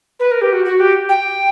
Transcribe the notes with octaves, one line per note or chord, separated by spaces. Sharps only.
B4
A#4
G4
F#4
F#4
G4
G5